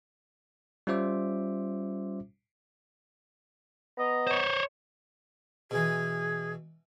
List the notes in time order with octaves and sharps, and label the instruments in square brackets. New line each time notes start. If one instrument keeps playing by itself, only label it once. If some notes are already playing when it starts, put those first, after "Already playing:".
[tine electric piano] G3 C#4 F4 C5 E5 D6
[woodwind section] B3 D#5 A#5
[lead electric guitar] C5 C#5
[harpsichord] B2 E3 [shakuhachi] G#4